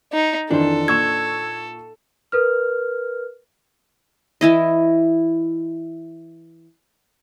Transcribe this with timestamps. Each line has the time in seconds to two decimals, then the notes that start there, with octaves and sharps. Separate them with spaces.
0.12 D#4
0.51 F2 D#3 E3 D4 A4 C5
0.88 A#2 C#6 E6 G#6 E7
2.32 A#4 B4 F6
4.41 E3 E4 D#5